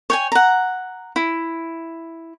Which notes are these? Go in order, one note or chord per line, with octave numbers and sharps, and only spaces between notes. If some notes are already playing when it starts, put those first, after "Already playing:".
C#5 G5 G#5
F#5 A#5
E4